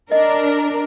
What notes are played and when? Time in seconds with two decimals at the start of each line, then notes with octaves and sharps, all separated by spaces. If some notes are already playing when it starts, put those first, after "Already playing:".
0.12 D4 A#4 D#5